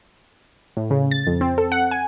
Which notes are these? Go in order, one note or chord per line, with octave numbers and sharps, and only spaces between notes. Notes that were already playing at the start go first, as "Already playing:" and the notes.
A2
C#3
A6
F2
C4
A4
F#5
G#5